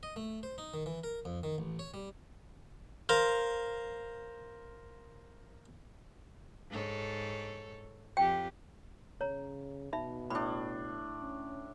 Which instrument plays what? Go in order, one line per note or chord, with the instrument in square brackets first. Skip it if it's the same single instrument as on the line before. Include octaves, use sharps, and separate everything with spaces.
[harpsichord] D#5
A3
C5
D#4
D#3
E3
A#4
F2
D#3
A1
C#5
G3
A#4 C5 F5
[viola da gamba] G#2 A4 C#5
[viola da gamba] F2 F4 G4 [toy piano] G5
[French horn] C#3 [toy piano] C#5 A#5
[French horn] B2 [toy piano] D#4 E5 B5
[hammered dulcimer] A2 D4 [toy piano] B5
[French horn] C#4